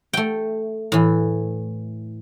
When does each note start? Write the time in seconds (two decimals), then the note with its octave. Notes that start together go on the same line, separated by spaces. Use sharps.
0.13 A3 G5
0.92 A2 E3